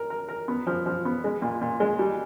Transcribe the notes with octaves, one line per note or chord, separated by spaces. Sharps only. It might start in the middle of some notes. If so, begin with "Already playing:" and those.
Already playing: A#4
A#4
A#4
B3
F3
F3
B3
G#3
A#2
A#2
G#3
G3